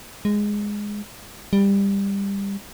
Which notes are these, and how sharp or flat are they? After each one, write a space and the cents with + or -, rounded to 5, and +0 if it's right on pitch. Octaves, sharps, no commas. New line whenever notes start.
G#3 -5
G3 +20